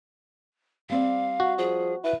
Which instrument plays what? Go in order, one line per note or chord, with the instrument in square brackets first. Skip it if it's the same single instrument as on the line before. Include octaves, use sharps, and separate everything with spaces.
[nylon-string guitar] G3 C4 D5 [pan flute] F5
[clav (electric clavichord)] F#4
[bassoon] F3 [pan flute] G#4
[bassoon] E4 [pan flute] B4